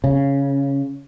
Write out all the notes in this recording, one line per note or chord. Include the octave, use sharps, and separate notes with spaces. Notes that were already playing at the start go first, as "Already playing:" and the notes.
C#3